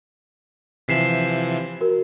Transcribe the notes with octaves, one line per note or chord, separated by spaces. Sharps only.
C3 E3 F3 B6 C7 E7
F#4 A#4